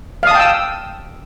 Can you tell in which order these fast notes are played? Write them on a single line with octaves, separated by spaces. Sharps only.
F5 D#6 A5 G5 E6